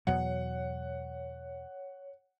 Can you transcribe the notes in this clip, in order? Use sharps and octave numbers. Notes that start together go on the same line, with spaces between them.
E2 B2 F#3 C#5 F#5